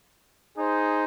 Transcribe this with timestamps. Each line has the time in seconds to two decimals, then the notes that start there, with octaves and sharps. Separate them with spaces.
0.57 D#4 G#4 C5